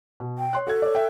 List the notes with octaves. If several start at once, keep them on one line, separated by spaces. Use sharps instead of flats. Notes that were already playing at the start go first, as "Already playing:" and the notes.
B2
G5
C#5 C6 F#6
F#4 A4 F#5 G#6
C#5 D5
E5 G5